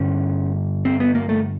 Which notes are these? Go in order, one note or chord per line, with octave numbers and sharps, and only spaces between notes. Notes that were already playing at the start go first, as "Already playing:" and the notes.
Already playing: G2 D3 C#4
C4
B3
A#3
A3